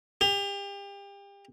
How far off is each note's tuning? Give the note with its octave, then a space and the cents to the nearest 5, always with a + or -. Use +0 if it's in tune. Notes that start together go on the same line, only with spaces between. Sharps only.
G4 +35